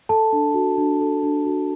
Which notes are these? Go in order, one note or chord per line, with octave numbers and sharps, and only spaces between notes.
A4 A5
D4
F#4
D4
A4
D4
F#4